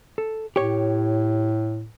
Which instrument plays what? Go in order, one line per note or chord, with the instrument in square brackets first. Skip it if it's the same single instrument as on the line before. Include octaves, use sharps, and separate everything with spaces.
[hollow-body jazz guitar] A4
[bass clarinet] A2 [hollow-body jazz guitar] G4 C#5